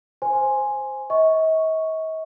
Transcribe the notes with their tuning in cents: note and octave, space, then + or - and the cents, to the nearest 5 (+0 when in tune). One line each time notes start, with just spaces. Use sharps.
C5 +0 G#5 +0 C6 +5
D#5 +45 C#6 +0